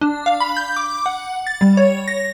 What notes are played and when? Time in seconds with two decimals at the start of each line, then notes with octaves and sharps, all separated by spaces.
0.01 D4
0.26 F5
0.40 B5
0.57 G6
0.76 D6
1.06 F#5
1.47 A6
1.61 G3
1.77 C#5
2.08 A#6